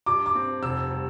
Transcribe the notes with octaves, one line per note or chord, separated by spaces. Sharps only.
G2 D6
D6
C4
F1 E6
G3